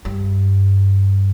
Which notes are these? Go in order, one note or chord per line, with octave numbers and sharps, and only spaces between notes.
G2